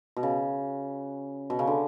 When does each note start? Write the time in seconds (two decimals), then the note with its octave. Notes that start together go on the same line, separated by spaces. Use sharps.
0.17 B2
0.23 C#3
1.50 B2
1.59 C#3
1.67 D3